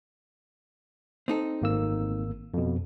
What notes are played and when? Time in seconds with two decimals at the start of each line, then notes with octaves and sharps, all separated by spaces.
1.28 C4 D#4 A4
1.62 G#1 A#3 E6
2.54 F2 B2